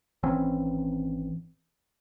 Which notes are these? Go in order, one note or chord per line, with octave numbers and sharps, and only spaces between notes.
G#1 E3 C4 C#4